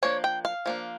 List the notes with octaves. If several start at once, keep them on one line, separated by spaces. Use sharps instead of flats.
F3 A#3 D4 C#5
G5
F5
F3 A#3 D4